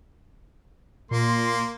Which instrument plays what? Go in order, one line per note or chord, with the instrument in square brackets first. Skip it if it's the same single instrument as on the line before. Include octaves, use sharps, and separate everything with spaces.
[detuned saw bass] A#2 [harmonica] A#3 [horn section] C6